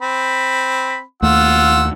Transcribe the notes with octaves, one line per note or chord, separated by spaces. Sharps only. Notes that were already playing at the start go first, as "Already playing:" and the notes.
C4 B5
D#2 A3 F4 F#5 E6